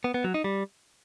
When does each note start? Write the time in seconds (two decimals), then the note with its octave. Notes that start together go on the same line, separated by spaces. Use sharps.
0.04 B3
0.14 B3
0.24 F#3
0.34 D#4
0.44 G3